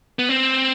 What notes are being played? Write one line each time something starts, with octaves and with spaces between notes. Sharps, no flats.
B3
C4